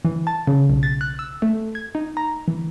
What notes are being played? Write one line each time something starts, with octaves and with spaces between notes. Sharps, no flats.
E3
A5
C#3
B1
A6
F#6
E6
A3
G#6
D#4
A#5
E3